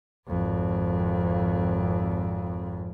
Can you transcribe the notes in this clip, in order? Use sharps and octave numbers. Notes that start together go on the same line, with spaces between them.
G#1 F2